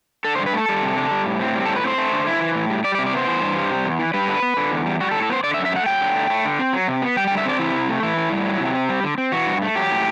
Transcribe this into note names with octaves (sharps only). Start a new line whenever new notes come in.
D3 A4
C5
G2
B4
A3 A4
G3
C3
D4
G3
A2
C4
G3
A4
A2
B4
C4 C5
A3
D3
E4
E3
A2
G3
G3 D5
D5
C3
D5
B3 C5
E3
G2
G3
C3
E2
E3
G3 B4
D3
B3
D3
E2
G3
G3 F#4
A4
A2
A4
B3 C5
D3 D5
E5
F#2
E5
A3 F#5
F#3 G5
D3
A3
A3
D3
C4
F#3
C3
B3
G3 G5
G5
D3
E5
C4 D5
E3 E4
C3
A3
E3 E4
A2
G3
F#3
C3
C4
G3
D3
C4
E3 F#4
G2
A3
F#3 G4
A2